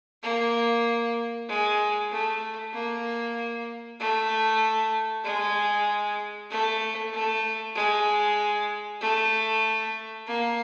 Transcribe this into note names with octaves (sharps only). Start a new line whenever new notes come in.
A#3
G#3
A3
A#3
A3
G#3
A3
A3
G#3
A3
A#3